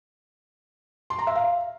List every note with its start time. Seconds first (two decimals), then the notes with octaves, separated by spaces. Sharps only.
1.10 C6
1.19 A#5
1.27 E5
1.35 F5